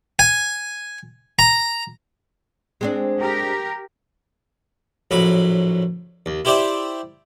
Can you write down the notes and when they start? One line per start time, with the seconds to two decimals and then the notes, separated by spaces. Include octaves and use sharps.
0.19 G#5
1.39 A#5
2.81 G#3 C4 D4
3.17 G4 A#4
5.11 A#1 A2 F#3 B5
6.26 D#2
6.45 E4 G4 C5 D5 E5